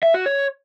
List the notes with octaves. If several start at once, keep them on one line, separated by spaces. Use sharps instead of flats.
E5
F#4
C#5